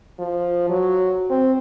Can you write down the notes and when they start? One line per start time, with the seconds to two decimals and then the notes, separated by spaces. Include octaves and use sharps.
0.19 F3
0.70 F#3
1.30 C4